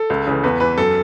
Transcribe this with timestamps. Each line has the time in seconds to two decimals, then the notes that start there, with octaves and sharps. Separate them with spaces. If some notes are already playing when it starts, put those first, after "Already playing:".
Already playing: A4
0.10 C#2
0.27 C#3 E3
0.43 E2 B4
0.60 E3 B4
0.78 F#2 A4